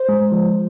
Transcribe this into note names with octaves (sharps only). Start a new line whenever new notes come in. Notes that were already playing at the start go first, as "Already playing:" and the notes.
Already playing: C5
G#3
F3